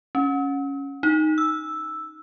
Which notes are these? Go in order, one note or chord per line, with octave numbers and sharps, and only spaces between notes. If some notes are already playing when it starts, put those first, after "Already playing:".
C#4
D#4
E6